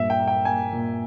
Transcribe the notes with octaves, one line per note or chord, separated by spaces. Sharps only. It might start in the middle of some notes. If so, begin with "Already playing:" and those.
Already playing: G2 A#2 E5
G5
A#3
G5
A#3 G#5
A#2